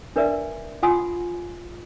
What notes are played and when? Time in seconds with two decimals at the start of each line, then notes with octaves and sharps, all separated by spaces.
0.16 D4 A#4 B4 D5 E5
0.83 F4 F#5 G#5 C6 D#6